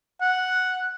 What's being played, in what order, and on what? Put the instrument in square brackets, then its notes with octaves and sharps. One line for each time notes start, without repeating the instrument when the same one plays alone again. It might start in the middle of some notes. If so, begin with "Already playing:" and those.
[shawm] F#5